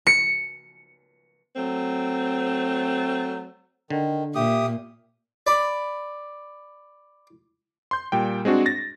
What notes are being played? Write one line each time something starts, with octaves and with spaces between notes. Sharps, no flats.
C#7
F#3 A3 C4
D3 D#3
A#2 G4 E5 D#6
D5 B5
C6 G6
A#2 G3 G5
G#3 C4 D4 F#4
A6 A#6